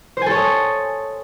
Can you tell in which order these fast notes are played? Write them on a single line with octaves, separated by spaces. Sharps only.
C5 G#5 A4 C#5 D#5